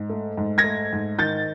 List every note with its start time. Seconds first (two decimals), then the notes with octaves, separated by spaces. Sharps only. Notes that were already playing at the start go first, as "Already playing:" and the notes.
Already playing: G#2
0.10 A3
0.37 G#2
0.58 G#6 A#6
0.64 A3
0.93 G#2
1.19 D#3 G6 A6